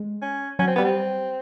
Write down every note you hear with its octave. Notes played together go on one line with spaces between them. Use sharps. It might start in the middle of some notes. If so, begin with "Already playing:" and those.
Already playing: G#3
C#4
F#3 C#4
C4
G3 B3
C4